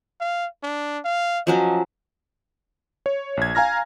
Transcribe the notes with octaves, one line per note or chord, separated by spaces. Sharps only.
F5
D4
F5
F3 F#3 C#4 D#5
C#5
A#1 G#6
F5 G#5 A#5 F6 A#6